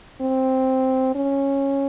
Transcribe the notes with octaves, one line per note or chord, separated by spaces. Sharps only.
C4
C#4